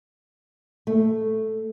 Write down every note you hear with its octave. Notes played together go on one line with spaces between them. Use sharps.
A3